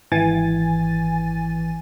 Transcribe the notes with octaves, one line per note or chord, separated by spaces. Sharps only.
G#1 E3 G#5 A6